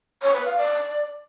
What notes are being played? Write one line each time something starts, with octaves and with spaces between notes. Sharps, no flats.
C#5
B4
F5
D5